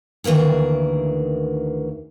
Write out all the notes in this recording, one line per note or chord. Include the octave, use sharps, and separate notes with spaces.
D2 D#3 E3 A#3 G#4